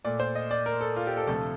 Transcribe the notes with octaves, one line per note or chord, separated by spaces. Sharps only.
A#2 A3 D5
C5
D#5
D5
A#4
A4
F4
G4
A4
D2 C3 F3 A3 A4